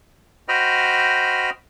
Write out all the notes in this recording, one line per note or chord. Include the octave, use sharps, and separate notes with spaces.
F#4 C5 D#5 G5 B5 F6